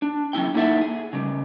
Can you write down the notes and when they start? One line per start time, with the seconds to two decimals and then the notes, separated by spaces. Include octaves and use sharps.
0.02 D4
0.33 F#3 C#4 E4 G5
0.54 A#3 D#4 E4 A4 E5 F#5
0.81 G#4
1.13 C#3 G3